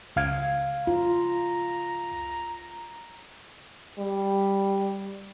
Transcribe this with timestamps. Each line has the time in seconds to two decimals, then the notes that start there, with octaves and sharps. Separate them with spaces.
0.16 C#2 F5 G#6
0.87 F4 A#5
3.98 G3